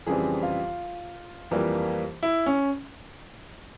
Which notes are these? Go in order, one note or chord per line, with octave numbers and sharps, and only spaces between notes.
F2 C#3 E3 G3 C4 G#4
F4
F2 E3 G3 A#3
E4
C#4